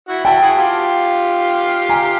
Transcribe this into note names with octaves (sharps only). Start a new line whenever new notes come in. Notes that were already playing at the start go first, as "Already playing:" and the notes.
E4 F#4
E4 F#4 G5 A5
F#4 G#4
F4 G4
G#5 A#5